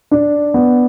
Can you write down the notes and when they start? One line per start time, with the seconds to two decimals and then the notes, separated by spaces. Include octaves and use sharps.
0.11 D4
0.54 B3